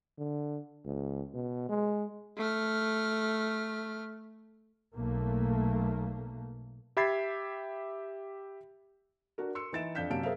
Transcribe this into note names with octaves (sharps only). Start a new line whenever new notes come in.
D3
C#2
B2
G#3
A3 F6
B1 A3 A#3
G4 E5 B5 G#6 A6 C7
D4 F#4 A#4
C6 E6 C#7
E3 D#4 E5 A6 D7 E7
F2 D4 F5 G6 B6 E7
F#2 C3 A#3 F5 A5 D7
G#4 A#4 C5 E5 F5